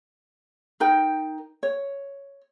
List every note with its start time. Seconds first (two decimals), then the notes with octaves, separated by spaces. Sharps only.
0.80 D#4 A#4 G5 A#5
1.63 C#5